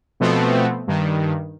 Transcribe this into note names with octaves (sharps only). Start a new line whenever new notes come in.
B2 F3 A3 B3 C4
G2 D#3